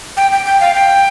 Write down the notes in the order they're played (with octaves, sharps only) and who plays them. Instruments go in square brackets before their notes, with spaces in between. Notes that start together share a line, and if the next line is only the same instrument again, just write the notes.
[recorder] G5
G5
G5
F5
G5